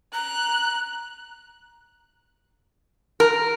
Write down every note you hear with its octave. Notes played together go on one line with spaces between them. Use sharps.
A#5 F#6
A#4